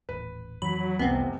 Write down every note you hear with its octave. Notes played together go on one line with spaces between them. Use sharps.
D#1 A1 B4
F2 D#3 E3 F#3 B5
F1 C2 C3 B3 C4